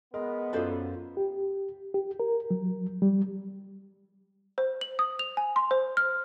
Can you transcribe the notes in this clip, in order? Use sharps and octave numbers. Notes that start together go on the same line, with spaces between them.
G#3 B3 A#4
F#2 F4 A4 C5 D5
G4
G4
A#4
F#3
G3
C5
F#7
D#6
F7
G#5
C6
C5
F6